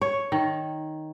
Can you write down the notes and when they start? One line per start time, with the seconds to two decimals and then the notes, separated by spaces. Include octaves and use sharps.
0.02 C#5
0.32 D#3